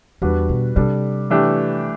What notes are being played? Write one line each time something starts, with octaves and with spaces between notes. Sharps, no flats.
E2 G3 D4 F#4 B4
B2
C3 G3 D4 A4
E3 A3 D4 G4